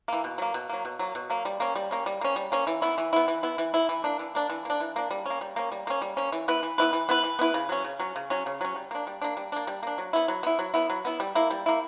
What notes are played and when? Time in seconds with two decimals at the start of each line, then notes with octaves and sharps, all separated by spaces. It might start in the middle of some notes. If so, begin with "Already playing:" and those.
0.08 E3 A#3
0.24 B2
0.38 F#3 A#3
0.54 B2
0.70 F#3 A#3
0.85 B2
0.99 F#3 A#3
1.15 B2
1.30 F#3 A#3
1.45 G3
1.60 A#3 C#4
1.76 G3
1.91 A#3 C#4
2.06 G3
2.21 A#3 C#4
2.36 G3
2.52 A#3 C#4
2.67 E3
2.82 B3 E4
2.98 E3
3.13 B3 E4
3.28 E3
3.43 B3 E4
3.58 E3
3.74 B3 E4
3.89 E3
4.04 A#3 D4
4.19 E3
4.35 A#3 D4
4.50 E3
4.65 A#3 D4
4.80 E3
4.96 A#3 D4
5.11 G3
5.26 A#3 C#4
5.41 G3
5.56 A#3 C#4
5.72 G3
5.87 A#3 C#4
6.02 G3
6.17 A#3 C#4
6.32 E3
6.48 B3 E4 B4
6.63 E3
6.78 B3 E4 B4
6.93 E3
7.09 B3 E4 B4
7.24 E3
7.39 B3 E4 B4
7.54 C#3
7.69 F#3 C#4
7.84 C#3
8.00 F#3 C#4
8.16 C#3
8.30 F#3 C#4
8.46 C#3
8.61 F#3 C#4
8.76 G3
8.91 A#3 D4
9.07 G3
9.22 A#3 D4
9.37 G3
9.52 A#3 D4
9.67 G3
9.83 A#3 D4
9.98 F#3
10.13 B3 E4
10.28 F#3
10.43 B3 E4
10.59 F#3
10.74 B3 E4
10.90 F#3
11.05 B3 E4
11.20 G3
11.35 A#3 E4
11.51 G3
11.66 A#3 E4